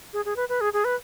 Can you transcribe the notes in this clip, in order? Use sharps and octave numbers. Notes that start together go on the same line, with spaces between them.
G#4
G#4
B4
B4
G#4
G#4
B4